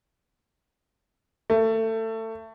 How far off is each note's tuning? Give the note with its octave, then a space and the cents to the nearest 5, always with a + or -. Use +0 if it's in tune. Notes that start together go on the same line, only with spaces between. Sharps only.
A3 +25